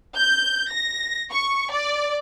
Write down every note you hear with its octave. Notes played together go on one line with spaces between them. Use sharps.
G6
A#6
C#6
D5